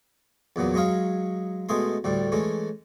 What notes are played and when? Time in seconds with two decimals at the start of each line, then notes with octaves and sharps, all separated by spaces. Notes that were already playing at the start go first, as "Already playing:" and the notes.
0.56 E2 A#2 F#3 B3
0.74 F#3 G#3 D#4 C#5 F5
1.69 B2 G#3 A3 G#4 C6
2.04 D2 A2 G3
2.32 E3 G#3 A3 C#4